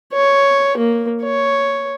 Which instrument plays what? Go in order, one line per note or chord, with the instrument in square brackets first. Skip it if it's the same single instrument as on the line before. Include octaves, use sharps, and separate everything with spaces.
[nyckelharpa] C#5
A#3
C#5